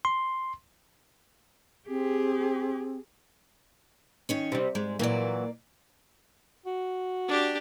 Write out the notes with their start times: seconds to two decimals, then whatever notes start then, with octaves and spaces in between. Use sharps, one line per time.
0.05 C6
1.89 C4 G4 G#4
4.29 D#3 C#4 C#5
4.52 C3 G3
4.75 G#2 G#3
4.99 A#2 E3 F#3 A#3 D5
6.66 F#4
7.28 D4 G4